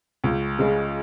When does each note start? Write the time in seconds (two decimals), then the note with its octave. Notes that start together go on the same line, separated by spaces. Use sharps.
0.24 C#2
0.59 C#3 G#3